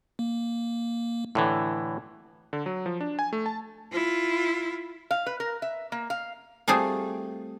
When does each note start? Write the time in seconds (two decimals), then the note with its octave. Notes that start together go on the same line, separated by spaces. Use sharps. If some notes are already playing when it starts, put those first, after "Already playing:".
0.19 A#3
1.35 A2 D3 E3
2.53 D3
2.66 F#3
2.86 F3
3.01 D4
3.19 G#5
3.33 A3
3.46 A5
3.93 E4 F4
5.11 F5
5.26 B4
5.40 A#4
5.62 E5
5.92 A#3
6.10 F5
6.68 G3 A3 C4 F4 G#4